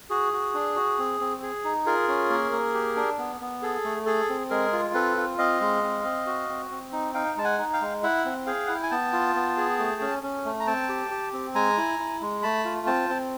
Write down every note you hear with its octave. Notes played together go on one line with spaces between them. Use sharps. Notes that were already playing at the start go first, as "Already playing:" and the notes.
F#4 G#4
F#4
D4
F#4
C4
C4
G#4
D#4
F4 G#4 A#4
C#4
A#3
A#3
G4
D4
B3
B3
G#4 A4
A3
G#4 A4
C4
G#3 G#4 A#4
F4
C4 A4 B4
F4
C4 D#5 F5
G#3
C4
C4
F#4
C4
C4
D#4
D#4 F5 G5
G#3 A5
F#5 G#5
D#4
F5 G5
G#3
E4 E5 F#5
C4
G#4 F5 G5
E4 F#5
G5
G#5
B3 G5 A5
F4
B3
G#4
A3
C#4
C#4
A3
A#5
C4 G5 A5
G4
G4
C4
G#3 G#5 A#5
E4
E4
G#3
A3 A5 B5
F4
C4 G5 A5
C4